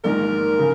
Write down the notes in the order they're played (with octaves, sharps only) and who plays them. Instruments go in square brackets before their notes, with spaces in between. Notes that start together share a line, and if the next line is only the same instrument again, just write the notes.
[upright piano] A#1 G#2 D#3 [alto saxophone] A#4
[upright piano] C#3